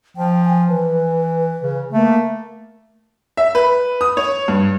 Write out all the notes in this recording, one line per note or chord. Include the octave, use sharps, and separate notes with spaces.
F3 G5
G#5
E3 B4
C#3
A3 A#3
E5
B4
D#6
C#5
G2